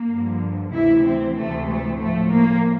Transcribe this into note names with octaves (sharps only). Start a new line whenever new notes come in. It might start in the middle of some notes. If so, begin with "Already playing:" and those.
Already playing: A#3
G2 D3 F3
D2 C3 E3 E4
C4
D2 C3 E3 A3
A3
A2 F3 A3
A#3